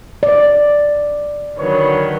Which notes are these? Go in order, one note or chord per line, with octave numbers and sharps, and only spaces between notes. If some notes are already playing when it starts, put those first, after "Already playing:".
D5
D3 D#3 F#3 B4 C#5